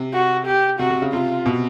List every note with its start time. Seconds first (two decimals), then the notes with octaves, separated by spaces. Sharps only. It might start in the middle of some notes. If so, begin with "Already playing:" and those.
Already playing: C3
0.13 F#4
0.46 G4
0.79 C3 F#4
0.90 C3
1.02 C#3
1.13 C3 F4
1.46 B2